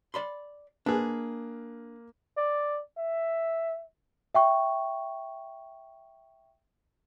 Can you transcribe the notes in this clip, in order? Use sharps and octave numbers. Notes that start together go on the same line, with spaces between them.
D5 B5 C6
A#3 D4 G#4 B4
D5
E5
E5 G5 C#6